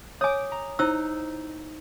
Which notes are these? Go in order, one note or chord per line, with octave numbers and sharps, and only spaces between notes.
C#5 G#5 D6 D#6
A#5
D#4 E4 C5 E6